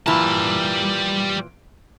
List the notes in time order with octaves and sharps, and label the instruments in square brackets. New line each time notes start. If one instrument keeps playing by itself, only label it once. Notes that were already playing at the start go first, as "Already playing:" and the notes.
[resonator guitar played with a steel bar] A#2 E3 [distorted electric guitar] G3 A5